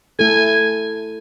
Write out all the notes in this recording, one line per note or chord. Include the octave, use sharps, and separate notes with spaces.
A3 E4 A4 G#5